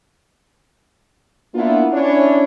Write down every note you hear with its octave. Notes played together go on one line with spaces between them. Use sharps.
A#3 B3 D4 E4 F4
C#4 D4 E4 C#5